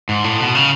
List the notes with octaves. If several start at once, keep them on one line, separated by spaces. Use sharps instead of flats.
G#2
A2
B2
C#3